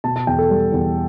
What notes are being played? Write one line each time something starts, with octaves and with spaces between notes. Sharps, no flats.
B2 A5
A5
E2 G5
A4
G3
E2